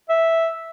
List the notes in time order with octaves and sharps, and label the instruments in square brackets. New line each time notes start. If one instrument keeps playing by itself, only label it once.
[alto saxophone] E5